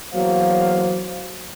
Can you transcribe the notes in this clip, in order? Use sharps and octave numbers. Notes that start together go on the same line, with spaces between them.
E2 F#3 A#3 C5 F5